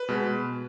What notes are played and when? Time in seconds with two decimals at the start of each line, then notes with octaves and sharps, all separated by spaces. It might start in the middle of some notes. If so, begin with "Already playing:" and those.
Already playing: B4
0.09 B2 G#3